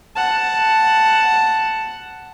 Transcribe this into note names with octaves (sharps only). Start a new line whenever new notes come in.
F#5 A5